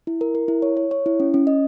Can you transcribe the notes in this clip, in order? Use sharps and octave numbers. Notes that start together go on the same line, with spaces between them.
E4
A#4
A#4
E4
C#5
C#5
C#5
E4
C#4
C#4
D#5